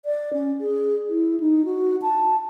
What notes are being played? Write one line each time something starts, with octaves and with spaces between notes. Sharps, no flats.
D5
C#4
G#4
E4
D#4
F#4
A5